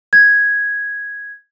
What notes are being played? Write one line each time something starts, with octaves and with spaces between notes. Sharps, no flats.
G#6